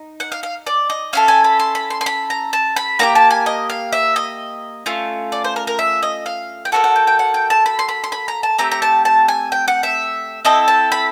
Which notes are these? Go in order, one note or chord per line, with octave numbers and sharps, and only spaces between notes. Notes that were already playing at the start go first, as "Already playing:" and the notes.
Already playing: D#4
F#5
F5
F5
D5
D#5
C#4 E4 A4 F5
G#5
B5
C6
B5
C6
C6
B5
A#5
A5
B5
A#3 D#4 G4 A#5
A5
G#5
D#5
F5
E5
D#5
A3 C#4 F4
D5
C5
A#4
A#4
E5
D#5
F5
G5
A#3 C#4 F#4 A4 F#5
F#5
G5
G5
F#5
G5
A5
B5
C6
B5
C6
B5
A#5
A5
A3 C4 G4 A#5
A#5
A5
A5
G#5
G5
F#5
E5
C4 E4 A4 D#5
A5
B5